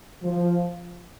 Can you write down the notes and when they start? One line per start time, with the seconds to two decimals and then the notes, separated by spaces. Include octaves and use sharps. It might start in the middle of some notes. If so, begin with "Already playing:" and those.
0.24 F3